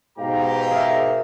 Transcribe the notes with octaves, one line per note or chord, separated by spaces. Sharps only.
G#2 B2 G4 F5 G5 A#5
G#4 A#4 E5